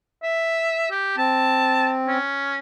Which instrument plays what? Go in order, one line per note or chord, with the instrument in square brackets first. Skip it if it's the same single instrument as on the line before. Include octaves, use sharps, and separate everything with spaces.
[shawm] E5
G4
[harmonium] C4 [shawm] A5
[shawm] C#4